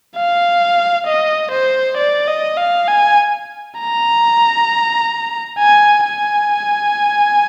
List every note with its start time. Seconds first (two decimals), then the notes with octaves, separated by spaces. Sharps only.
0.16 F5
1.07 D#5
1.52 C5
1.98 D5
2.28 D#5
2.57 F5
2.88 G#5
3.78 A#5
5.59 G#5
6.04 G#5